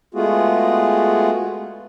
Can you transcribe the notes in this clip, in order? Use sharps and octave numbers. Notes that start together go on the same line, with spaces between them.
G#3 A3 B3 F4 F#4 G#4